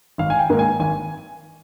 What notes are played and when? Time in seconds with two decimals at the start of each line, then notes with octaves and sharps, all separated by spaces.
0.18 G#1 F5
0.30 G#5
0.39 G5
0.49 G#2 D#3 A#3
0.59 G#5
0.80 G#1 G#5